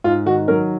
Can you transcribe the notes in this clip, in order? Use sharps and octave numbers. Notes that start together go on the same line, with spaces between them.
G#2 F4
D#3 F#4
F#3 A#4